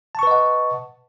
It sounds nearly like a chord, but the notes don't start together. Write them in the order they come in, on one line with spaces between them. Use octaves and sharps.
A5 C#6 B4 D#5 F#5